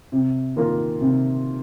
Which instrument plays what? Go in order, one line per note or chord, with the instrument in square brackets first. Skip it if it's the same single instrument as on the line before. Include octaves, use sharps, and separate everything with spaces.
[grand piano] C3
D#3 A#3 F4 A#4
C3